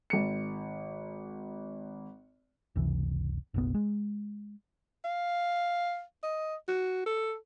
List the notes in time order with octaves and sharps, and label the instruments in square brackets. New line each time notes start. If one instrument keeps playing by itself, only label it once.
[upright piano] G#1 C#7
[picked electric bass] F#1 C#2 C3 E3
F#1 B1 B3
G#3
[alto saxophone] F5
D#5
F#4
A4